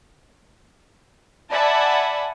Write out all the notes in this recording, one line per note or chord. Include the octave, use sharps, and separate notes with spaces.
D5 E5 F#5 G#5 A5 B5